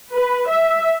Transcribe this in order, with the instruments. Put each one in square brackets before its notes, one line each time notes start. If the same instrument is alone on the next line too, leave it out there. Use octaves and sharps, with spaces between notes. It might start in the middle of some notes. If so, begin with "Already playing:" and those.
[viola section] B4
E5